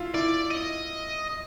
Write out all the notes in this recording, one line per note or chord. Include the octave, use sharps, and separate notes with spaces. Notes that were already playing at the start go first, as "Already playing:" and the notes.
Already playing: E4 F4
E4 D5
D#5